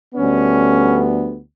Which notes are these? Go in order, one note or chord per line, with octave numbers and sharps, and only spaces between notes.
D2 D3 G3 B3 C#4